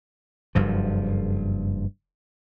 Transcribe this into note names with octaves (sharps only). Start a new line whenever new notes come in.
F#1 G2 F3